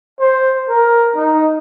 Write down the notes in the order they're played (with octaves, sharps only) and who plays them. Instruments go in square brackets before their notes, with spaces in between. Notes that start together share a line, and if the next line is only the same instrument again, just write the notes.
[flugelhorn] C5
A#4
D#4